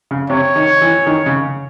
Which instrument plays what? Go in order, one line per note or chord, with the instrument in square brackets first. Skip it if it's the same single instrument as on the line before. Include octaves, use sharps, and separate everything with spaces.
[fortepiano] C#3
[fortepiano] C3 [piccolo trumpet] C#5
[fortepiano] D#3
E3
D#3
C#3